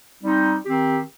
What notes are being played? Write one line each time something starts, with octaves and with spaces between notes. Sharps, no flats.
G3 C4 D#4
D#3 C4 G4